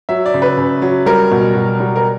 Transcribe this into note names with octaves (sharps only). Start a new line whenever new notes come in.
F#3 E5
D5
C#3
B4
C#3
F#3
G3 A#4
B2
B2
G3
A#4